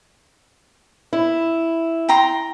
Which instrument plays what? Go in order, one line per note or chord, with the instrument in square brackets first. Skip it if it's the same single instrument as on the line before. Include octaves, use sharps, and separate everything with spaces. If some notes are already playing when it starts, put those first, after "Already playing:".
[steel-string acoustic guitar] E4
[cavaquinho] G5 A#5 C6